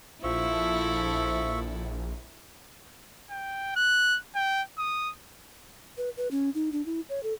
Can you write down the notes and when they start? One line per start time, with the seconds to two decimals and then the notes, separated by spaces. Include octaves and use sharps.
0.24 A#1 F3 E4 A4 E5 C#6
3.30 G5
3.76 F#6
4.35 G5
4.78 D#6
5.97 B4
6.17 B4
6.31 C#4
6.55 D#4
6.72 D4
6.86 E4
7.09 C#5
7.23 A4